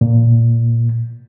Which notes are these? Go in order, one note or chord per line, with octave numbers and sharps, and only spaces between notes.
A#2